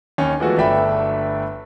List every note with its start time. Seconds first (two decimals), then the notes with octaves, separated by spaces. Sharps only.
0.18 D#2 C#4
0.40 E3 F3 G#3 A3 B3 F#4
0.58 G1 A3 D4 E5 G5 B5